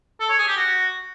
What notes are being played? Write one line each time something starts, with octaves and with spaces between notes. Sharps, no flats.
A4
C#5
G#4
G4
F#4